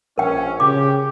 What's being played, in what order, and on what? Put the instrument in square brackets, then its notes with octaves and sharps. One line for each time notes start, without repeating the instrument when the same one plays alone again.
[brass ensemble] A#1 C#4 [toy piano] A#4 G5
[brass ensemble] C#3 G4 [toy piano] D6